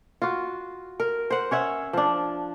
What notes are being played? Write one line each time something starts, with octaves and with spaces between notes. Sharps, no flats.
F4 F#4
A#4
C5 F#5
C#4 C#5 E5 F#5
F3 D4